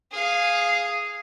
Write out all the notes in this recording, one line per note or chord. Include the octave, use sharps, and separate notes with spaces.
G#4 F5